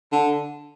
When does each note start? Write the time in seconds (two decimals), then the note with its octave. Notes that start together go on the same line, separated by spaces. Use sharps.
0.12 D3